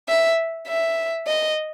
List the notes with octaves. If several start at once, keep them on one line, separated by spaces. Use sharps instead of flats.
E5
E5
D#5